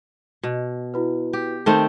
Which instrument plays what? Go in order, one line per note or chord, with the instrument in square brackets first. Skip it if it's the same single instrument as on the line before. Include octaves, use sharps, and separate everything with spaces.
[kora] B2
[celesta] E4 F#4 B4
[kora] G4
[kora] D#3 A3 C4 [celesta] A5